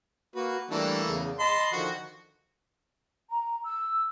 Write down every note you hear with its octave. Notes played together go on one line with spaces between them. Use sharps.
A#3 F#4 B4
E3 G3 A3 A#3 D4
E2 C#3
D#5 A5 B5 C6
D3 D#3 F3 F#4
A#5
E6